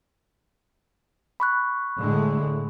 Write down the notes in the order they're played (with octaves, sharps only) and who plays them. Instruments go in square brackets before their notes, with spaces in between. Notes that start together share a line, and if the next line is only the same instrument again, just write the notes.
[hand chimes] B5 C#6 F#6
[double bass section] A2 D3 G#3